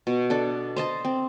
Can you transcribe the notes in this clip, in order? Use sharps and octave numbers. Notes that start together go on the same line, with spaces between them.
B2
D4 A4
C5 D#5 A5
C4